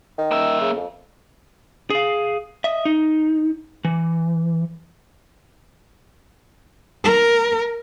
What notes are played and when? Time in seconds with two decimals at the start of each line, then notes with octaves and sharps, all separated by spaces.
0.18 D#3
0.31 A#3 E5
0.61 C#3
0.76 F2
1.90 G#4 F5
2.64 D#5 E5
2.85 D#4
3.85 E3
7.04 A#4